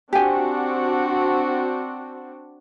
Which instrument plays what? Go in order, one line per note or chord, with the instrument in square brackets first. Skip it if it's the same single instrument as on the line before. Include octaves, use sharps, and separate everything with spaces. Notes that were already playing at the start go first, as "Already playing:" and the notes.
[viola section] C4 D4 F#4 [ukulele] G4 G#5